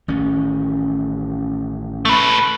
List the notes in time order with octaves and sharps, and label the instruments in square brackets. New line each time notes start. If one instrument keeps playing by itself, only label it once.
[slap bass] A1 D#3 C#4
[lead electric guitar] A3 B4